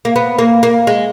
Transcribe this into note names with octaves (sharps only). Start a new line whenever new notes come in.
A#3
B3
A#3
A#3
G#3